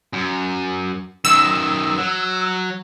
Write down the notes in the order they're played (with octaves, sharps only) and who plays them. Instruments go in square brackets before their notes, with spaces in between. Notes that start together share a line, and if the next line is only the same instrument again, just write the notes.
[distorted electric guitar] F#2
[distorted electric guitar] F#2 D#3 [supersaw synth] E6
[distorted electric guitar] F#3